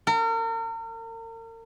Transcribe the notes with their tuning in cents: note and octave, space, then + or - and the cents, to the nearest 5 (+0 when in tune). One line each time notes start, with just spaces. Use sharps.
A#4 -40